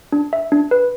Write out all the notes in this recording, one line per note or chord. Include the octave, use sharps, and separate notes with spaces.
D4
E5
D4
B4